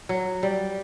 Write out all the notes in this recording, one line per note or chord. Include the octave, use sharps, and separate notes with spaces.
F#3
G3